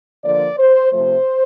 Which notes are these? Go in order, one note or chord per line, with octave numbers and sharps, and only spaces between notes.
D3 F3 A#3 D5
C5
C3 F3 A3 C5